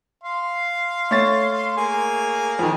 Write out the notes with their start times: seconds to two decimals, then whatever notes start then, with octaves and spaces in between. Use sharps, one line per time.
0.24 F5 C6
1.11 A3 C#5 A6
1.77 A#3 G#4 G#5
2.59 F2 D#3